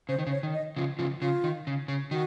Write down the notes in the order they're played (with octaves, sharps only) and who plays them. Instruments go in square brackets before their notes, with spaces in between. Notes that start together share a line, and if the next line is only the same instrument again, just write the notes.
[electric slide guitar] C#3 [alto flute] C5
[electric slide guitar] D#3
C#3
[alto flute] C#5
[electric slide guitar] D#3
[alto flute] D#5
[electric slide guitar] C#3 F3 [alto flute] F4
[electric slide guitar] C#3 F3 [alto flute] F4
[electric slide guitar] C#3 [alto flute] F4
[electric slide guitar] D#3
C#3
C#3
[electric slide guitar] D#3 [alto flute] F#4